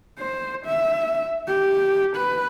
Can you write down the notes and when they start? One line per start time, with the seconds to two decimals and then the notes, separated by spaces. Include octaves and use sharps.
0.19 C5
0.66 E5
1.47 G4
2.17 B4